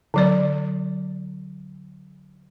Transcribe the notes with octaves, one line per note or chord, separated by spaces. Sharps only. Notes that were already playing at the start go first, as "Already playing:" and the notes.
D3 F#3 D5